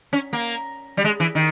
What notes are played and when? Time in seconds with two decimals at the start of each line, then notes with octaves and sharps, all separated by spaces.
0.13 C#4
0.33 A#3
0.97 G3
1.04 G#3
1.20 E3
1.35 D#3